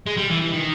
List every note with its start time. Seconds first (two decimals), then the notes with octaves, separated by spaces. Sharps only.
0.06 G#3
0.17 G3
0.30 E3
0.42 E3
0.53 D#3